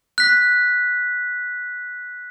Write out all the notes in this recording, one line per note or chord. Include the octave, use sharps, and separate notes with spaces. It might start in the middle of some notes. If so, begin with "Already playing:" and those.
F#6 B6